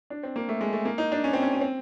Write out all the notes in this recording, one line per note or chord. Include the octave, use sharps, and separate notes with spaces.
D4
C4
A#3
A3
G#3
A3
A#3
D#4
D4
C#4
C4
C#4
C#4
C4